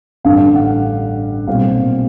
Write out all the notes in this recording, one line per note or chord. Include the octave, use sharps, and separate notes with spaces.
A1 G2 D3 G3 F5
F#5
B1 A#2 G3 C4 F5